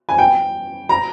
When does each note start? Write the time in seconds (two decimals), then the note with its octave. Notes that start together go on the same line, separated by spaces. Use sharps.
0.09 G#5
0.18 G5
0.89 A#5